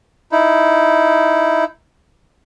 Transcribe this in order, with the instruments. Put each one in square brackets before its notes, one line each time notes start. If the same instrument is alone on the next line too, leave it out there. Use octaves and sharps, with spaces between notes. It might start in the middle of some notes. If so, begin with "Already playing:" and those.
[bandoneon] D#4 E4